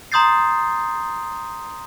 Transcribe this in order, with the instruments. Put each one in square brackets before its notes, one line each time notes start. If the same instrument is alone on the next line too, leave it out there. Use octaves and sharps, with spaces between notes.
[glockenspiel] A#5 C6 D#6 G6 A6 C7